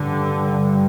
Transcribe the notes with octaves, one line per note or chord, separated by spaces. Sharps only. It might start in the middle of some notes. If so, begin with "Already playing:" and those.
Already playing: G2 D3